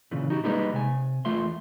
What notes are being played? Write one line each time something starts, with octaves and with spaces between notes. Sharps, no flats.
A#2 C#3 E3
D#4 F#4 G4
G3 G#3 A#3 D#4 G#4 B4
C3 G#5
E2 E3 A3 F4 E5 C6